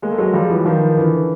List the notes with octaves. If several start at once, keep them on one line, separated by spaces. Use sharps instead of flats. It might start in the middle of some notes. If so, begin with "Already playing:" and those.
G#3 A#3
A3
F#3 G#3
F3 G3
E3 F#3
D#3 F3
D3 E3